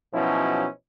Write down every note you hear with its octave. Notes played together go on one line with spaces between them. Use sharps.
B2 F3 F#3 C#4 D#4 E4